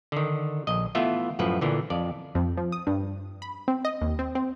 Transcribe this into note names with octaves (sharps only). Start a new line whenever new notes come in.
D3 D#3
A#1 D#5
E3 A3 B3 F4 E5
F#2 A2 F3 B4
A#2 D3 E3
F2 D5
F2
F3
D#6
G2
B5
C4
D#5
D#2
C4
C4